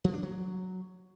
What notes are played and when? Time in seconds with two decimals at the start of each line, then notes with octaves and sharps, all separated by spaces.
0.04 F3
0.14 D4
0.23 F#3